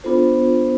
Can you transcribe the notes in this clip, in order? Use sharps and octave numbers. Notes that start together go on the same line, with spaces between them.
B3 D4 F4 A4 C5